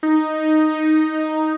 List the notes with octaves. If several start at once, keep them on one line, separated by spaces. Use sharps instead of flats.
D#4